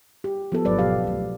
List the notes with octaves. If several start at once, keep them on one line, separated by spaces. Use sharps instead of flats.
G4
F3 B3 A4
G#1 F#3 B4 D5
B2 G4 F5
D1 C#2